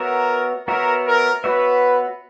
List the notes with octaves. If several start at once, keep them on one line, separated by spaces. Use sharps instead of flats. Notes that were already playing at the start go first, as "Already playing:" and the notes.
Already playing: B3 F#4 A#4 C#5 E5
B3 F#4 A#4 C#5 E5
A#4
B3 F#4 B4 C#5 E5